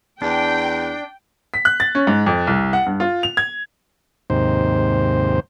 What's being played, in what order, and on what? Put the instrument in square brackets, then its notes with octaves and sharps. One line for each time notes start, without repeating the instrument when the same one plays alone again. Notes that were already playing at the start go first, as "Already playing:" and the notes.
[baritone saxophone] E2 [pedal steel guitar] D4 [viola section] G5
[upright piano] B6
F#6
A6
C#4
G#2
F2
C2
F#5
G2
F4
F7
G#6
[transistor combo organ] D#2 G#2 C3 C5